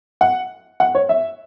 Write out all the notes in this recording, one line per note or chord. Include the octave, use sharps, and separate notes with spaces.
F#5
F#5
C#5
E5